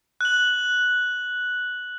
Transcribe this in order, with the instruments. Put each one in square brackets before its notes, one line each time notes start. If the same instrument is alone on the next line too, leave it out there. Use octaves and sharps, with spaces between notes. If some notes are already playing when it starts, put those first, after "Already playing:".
[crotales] F#6 F#7